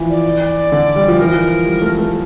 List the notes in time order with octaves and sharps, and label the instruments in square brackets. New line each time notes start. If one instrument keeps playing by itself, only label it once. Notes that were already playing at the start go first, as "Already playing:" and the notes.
Already playing: [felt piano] E3 F3
[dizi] D5
[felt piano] D3
G3
F3
[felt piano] E3 [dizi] A#4
[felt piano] F3
G3
A3
A3